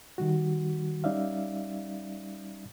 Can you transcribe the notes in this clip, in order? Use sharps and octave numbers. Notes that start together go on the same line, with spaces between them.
D#3 G3 F#4
G3 C#4 D#4 D5 E5 F5